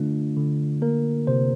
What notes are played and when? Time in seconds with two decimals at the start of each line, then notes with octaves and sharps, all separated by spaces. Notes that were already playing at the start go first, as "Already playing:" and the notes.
Already playing: D3 A3 D4 F4
0.36 D3
0.82 A#3 A#4
1.27 C3 C5